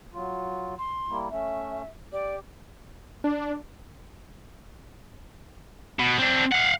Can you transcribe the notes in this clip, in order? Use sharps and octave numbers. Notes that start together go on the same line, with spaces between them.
F#3 F4
C6
G3 A#3 E4
A3 C#4 E5
G4 D5
D4
B2
C4 D4
F5 F#5